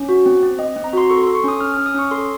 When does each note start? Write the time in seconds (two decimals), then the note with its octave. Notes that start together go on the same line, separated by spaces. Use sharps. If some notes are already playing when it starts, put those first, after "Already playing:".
Already playing: C#4
0.09 F#4
0.26 C4
0.43 C4
0.59 C4 D#5
0.76 C4
0.84 A#5
0.93 F#4 C6
1.10 A4 C#6
1.23 A4 C6
1.35 C#6
1.44 C#4 D#6
1.61 C#4 F6
1.74 C#4 F6
1.86 D#6
1.94 C#4 C#6
2.11 A4 C6